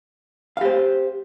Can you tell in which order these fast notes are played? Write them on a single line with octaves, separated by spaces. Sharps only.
F5 G4 C5